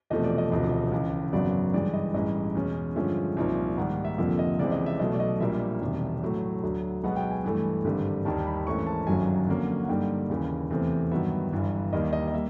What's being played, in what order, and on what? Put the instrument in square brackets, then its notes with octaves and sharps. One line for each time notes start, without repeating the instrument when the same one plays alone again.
[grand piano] E1 E2 C3 F3 A3 D#5
D5
D#5
E1 D2 C3 F3 D#5
D#5
C#2 C#3 E3
G#1 F#2 C#3 F#3 B3 D5
G2 E3 G#3 D5
D#5
A1 G2 E3 G#3 D#5
E2 B2 G#3 C#4
G2 D3 F3 G#3 C#4 E5
C2 A#2 F3 A#3 D#4
G#2 D#3 G3 A#3 F#5
E5
F1 F2 D3 F3 A#3 E5
D#5
C#2 C3 E3 G#3 C4 D5
D#5
E5
B1 B2 F#3 A3 D#5
D5
D#5
A#1 A#2 G3 A#3 E5
E1 E2 C3 D#3 G3
A2 F#3 A3
D2 D3 F#3
B1 B2 G#3 B3 F#5
G5
G#5
G2 E3 A3
G#1 G2 D3 G3
D#2 D#3 G3 A5
B5
G#1 G#2 E3 A3 C#4 C#6
A5
G1 F#2 D#3 F#3 G#5
F2 D3 F#3 A#3 C#4
F#5
G2 D3 G3 A#3 D#4 G5
D#2 C#3 E3
E2 C3 E3 A3 C4
G2 D#3 F#3 B3 E5
G1 G2 E3
D#2 D#3 G3 A#3 D#5
D#5
D#5
G3 A#3 E5